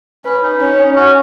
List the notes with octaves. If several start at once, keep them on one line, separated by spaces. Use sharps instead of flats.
C#4 B4
D#4
C#4
C#4 F#4